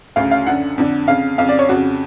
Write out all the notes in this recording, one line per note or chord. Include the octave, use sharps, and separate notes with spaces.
D2 C#3 F5
F5
F#2 D3 F#5
F2 D3
F2 C#3 F5
F2 C#3 F5
D5
C#5
F2 C#3 F#4